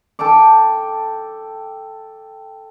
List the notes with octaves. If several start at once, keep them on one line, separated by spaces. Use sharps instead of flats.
A4 G5 A5 D6